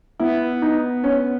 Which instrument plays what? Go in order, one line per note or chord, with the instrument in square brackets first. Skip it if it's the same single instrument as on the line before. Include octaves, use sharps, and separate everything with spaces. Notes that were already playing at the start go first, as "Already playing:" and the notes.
[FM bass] B3 [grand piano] E4
[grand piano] D#4
C#4